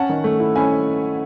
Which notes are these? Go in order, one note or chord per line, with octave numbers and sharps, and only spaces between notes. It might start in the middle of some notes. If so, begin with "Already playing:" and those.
Already playing: C#4 F#5 A5
D#3
A3
E4
C#4 G#5 B5